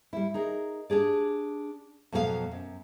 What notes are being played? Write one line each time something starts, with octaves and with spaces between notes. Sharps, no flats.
G3 E4
D#4 G#4 A#4
D4 G4 G#4 D5
F2 B2 F#3 G#4 F5
F#2